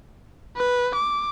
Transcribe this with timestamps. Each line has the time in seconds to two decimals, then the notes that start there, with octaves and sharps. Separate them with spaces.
0.57 B4
0.96 D6